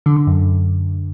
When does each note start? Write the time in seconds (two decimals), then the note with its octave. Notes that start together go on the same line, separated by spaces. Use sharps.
0.06 D3
0.17 D3
0.27 F#2